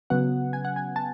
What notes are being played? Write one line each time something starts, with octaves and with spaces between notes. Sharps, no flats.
C#3 F#3 B3 F#5
G#5
F#5
G#5
A5